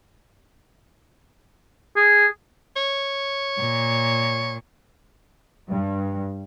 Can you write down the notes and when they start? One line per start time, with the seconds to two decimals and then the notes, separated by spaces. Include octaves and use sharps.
1.96 G#4
2.76 C#5
3.60 A#2
5.71 G2